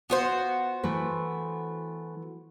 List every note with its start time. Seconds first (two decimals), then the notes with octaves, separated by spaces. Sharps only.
0.10 B3 F4 F#4 C5
0.83 E3 A3 B4